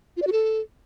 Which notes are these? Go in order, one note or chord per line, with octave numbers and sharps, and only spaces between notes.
F4
D5
F#4
A4